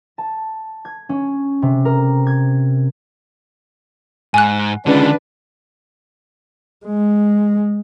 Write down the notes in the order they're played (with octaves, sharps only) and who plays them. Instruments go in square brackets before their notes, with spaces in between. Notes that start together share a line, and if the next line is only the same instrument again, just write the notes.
[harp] A5
G#6
C#4
C3
A#4
G#6
[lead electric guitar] G#2 [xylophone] G#5 F#6
[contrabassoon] C#2 [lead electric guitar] D3 D#3 [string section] D4 B4
[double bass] G#3